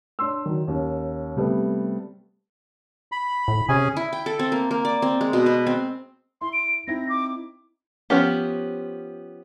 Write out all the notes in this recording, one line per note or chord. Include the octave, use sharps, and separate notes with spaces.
D4 C#5 C6 E6
D#3 F#3
D#2 C#4
C3 G3 A3 B3
B5
A2
C3 C#4 G#4 G#5
E4
G5
A4
C4
A#3
A#3
D5
C4
G#3
B2
B4
C4
E4 C6
D7
C4 D#4 E4 A#6
D6
F3 B3 C#4 G4